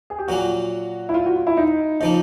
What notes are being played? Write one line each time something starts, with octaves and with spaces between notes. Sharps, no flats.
G#4
G4
A#2 F#3 A#3 F#4
E4
F4
F#4
F4
E4
D#4
C#3 F3 A#3 D#4